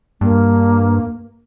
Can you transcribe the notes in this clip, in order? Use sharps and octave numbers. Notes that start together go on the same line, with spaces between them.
G2 A#3